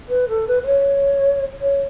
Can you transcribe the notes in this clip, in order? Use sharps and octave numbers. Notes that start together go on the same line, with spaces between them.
B4
A4
B4
B4
C#5
C#5